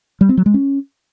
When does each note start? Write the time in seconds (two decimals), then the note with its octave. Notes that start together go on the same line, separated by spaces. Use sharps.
0.21 G3
0.29 C4
0.37 F#3
0.46 G#3
0.54 C#4